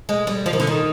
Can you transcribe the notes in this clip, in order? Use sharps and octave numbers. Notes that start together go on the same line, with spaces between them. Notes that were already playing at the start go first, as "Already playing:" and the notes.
G#3
G3
F3
D#3
D3
D#3